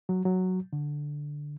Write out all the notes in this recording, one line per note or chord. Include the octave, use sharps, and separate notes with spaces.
F#3
F#3
D3